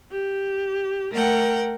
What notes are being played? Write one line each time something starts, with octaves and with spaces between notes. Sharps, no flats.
G4
A3 A#4 F#5 G5